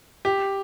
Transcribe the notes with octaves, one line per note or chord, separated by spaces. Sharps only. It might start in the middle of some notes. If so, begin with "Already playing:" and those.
G4